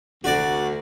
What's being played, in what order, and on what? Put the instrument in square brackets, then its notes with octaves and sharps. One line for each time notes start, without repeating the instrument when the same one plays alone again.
[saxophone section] D2 [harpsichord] F#4 D5